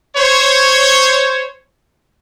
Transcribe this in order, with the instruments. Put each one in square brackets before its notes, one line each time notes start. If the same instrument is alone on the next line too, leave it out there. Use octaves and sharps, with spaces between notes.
[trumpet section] C5 C#5